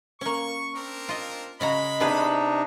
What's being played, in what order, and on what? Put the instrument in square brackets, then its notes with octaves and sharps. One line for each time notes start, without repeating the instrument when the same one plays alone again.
[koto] A#3 C#4 [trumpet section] C#6
[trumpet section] C4 D4 A#4
[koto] F4 D#5
[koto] C#3 F#4 A#5 [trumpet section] G#3 B5 [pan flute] D#5
[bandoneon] C3 D4 D#4 [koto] B3 G#4 B4